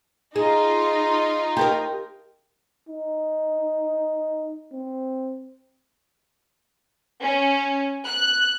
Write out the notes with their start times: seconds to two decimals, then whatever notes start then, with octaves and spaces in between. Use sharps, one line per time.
0.36 D#4 F4 G#4
1.57 G4 A4 A#4
2.88 D#4
4.72 C4
7.22 C#4
8.06 F#6